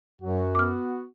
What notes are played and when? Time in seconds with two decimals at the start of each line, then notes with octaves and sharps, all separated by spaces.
0.22 F#2 F#3 F#4
0.55 B3 D6 F6